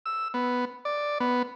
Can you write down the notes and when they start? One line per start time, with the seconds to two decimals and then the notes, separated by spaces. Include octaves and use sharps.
0.06 E6
0.34 B3
0.85 D5
1.20 B3